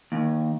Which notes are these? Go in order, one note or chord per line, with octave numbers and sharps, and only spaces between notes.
D#2